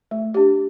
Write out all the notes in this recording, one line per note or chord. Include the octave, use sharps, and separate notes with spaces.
A3
D4 G4